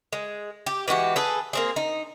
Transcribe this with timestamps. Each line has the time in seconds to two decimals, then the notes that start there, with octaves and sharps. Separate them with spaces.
0.13 G#3
0.66 G4
0.88 E3 G#3 F#4 G4
1.16 G#4 A4 B4
1.53 A#3 C4 G#4
1.76 D#4